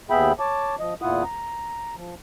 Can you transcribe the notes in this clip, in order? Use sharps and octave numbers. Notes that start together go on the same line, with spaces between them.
D#2 B3 G#4 E5 G5 B5
C#5 A5 D6
F3 D#5
E2 A#2 E4 F4 F#5 D#6
A#5
F3